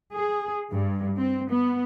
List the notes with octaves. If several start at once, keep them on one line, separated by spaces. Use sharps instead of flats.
G#4
G2
C4
B3